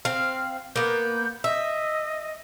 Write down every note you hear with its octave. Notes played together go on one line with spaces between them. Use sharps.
C4 F5
A#3 B3 G6
D#5 E5